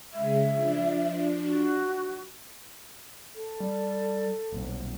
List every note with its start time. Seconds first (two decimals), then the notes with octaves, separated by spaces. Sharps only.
0.13 C#3 G#3 E5
0.52 F3 D4
1.43 F#4
3.34 A4
3.60 G3
4.52 D#1 B1